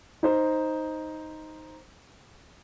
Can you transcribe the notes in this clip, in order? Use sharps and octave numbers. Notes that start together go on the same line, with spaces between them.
D#4 C5